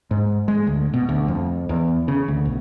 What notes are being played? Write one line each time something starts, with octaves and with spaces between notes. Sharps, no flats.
G#2
G#3
D2
B2
D2
F2
E2
C#3
D2
B1